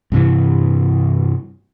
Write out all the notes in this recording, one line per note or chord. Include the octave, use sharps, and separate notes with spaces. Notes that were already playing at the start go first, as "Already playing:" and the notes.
G2 C3 E3